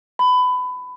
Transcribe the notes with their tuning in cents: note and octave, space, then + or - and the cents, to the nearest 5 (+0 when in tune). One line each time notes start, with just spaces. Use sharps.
B5 +20